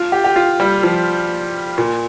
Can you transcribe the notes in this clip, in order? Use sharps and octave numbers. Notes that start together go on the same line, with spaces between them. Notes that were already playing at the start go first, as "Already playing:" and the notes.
Already playing: F4
G4
G4
F4
G3
F3
A#2